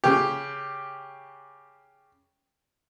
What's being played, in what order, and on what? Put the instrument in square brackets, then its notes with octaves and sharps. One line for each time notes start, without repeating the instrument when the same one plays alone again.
[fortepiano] C#3 G4